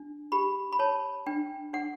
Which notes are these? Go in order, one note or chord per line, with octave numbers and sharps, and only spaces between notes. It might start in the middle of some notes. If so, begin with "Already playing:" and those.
Already playing: D4
G4 B5
B5
C#5 A5
D4 G5
D4 F#5